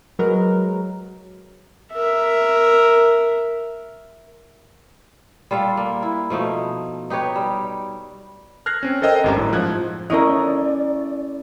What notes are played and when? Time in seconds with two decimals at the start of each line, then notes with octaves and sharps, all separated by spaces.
0.19 F#3 G#3 A#4 B4
1.93 A#4 E5
5.51 G3 F4 A4 F5
5.77 A#3
6.03 E4
6.30 B2 F3 A3 D#4
7.10 D#4 G4 B4 C#5
7.36 G3
8.66 F6 F#6 G#6 A#6 C7
8.83 C4 C#4
9.02 A4 A#4 C5 D#5 G5 E6
9.24 G#1 G2 C#4 G4 A#5
9.36 F#2 A2
9.52 G#2 F3 F#6 G#6
10.10 A3 C#4 E4 A#4 D5 D#5